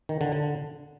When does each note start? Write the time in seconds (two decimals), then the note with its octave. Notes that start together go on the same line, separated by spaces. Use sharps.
0.09 D#3
0.21 D3
0.32 D3